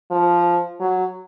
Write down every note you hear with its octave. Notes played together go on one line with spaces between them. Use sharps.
F3
F#3